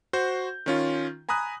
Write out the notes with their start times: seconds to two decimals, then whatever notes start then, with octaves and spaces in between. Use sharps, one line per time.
0.13 F#4 C5 G6
0.66 D#3 C#4 F4
1.29 G#5 A#5 B5 D#6 F#6